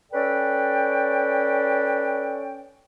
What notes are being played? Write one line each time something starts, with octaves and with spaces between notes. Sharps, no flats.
C#4 A4 B4 D5 G5